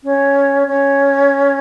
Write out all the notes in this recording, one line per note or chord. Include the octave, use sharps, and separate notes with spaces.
C#4
C#4